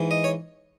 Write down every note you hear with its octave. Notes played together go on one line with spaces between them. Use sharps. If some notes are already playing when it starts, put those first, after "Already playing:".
Already playing: G#2 E3
D#5
C#5